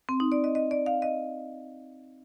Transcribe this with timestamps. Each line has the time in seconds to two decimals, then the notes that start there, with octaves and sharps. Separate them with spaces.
0.09 C4
0.20 D#4
0.32 D5
0.44 D#5
0.55 D#5
0.71 D5
0.86 F5
1.02 D#5